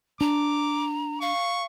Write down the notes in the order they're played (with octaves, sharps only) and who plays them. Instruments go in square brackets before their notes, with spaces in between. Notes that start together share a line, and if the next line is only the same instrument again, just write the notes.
[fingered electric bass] D4 [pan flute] A#5 [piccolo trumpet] D6
[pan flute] F5 [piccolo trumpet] C#6